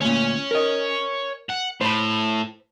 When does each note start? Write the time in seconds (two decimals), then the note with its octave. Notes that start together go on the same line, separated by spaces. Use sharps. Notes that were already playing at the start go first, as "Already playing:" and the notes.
0.01 D2 A#2 C#5 G#5
0.51 A#4 D#5
1.50 F#5
1.81 A2 C5 B5